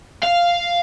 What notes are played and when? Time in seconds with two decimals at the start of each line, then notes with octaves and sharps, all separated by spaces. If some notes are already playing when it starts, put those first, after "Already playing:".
0.23 F5